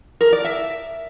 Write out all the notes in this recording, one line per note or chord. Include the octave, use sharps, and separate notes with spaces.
A#4
D5
E5